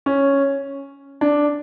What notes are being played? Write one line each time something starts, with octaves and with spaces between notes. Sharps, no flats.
C#4
D4